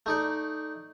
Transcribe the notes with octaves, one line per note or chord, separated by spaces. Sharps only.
A3 D#4 D5